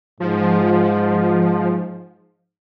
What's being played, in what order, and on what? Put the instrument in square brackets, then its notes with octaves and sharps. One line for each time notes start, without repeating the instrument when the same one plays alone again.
[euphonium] G#2 [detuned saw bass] F3